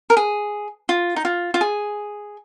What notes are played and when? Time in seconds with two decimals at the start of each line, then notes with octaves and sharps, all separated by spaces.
0.10 A#4
0.17 G#4
0.89 F4
1.16 D#4
1.25 F4
1.54 F4
1.61 G#4